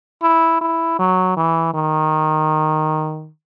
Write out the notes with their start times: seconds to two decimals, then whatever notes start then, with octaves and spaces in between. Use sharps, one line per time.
0.22 E4
0.61 E4
0.99 F#3
1.37 E3
1.74 D#3